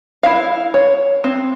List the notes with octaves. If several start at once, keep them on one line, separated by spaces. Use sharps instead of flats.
E4 F5
C#5
C4